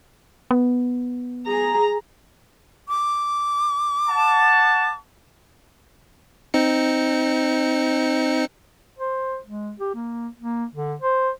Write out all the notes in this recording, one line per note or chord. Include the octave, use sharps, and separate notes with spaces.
B3
G#4 A#5
D6
F#5 A5
C4 D#4 C#7
C5
G#3
G4
A#3
A#3
D3
C5